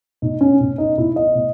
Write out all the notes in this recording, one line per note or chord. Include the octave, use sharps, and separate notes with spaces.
B2 D#4
C#4
B2
D#4
B2 E4
D#5
B2